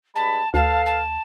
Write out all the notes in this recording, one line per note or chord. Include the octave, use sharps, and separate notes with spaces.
G2 G#3 A5 B5
D2 A4 B4 F5 A5
A5